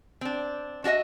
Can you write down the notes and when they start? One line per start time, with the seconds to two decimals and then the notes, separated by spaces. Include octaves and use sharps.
0.21 C4 D4
0.84 D4 F#4 G#4 D#5 E5